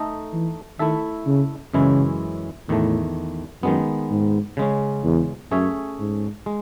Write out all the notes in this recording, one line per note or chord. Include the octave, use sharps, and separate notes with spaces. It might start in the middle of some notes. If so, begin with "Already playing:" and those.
Already playing: A3 D#4 A4 D#5
E3
D#3 A3 E4 A4 E5
C#3
F#2 C#3 E3 G#3 C#4 E4
E2 A2 D#3 A3
F#2 D#3 G#3 B3
G#2
C#3 G#3 C#4
E2
F#2 A3 C#4 G#4 C#5 E5
G#2
G#3